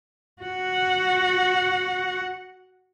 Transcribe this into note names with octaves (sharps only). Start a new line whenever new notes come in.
F#4 F#5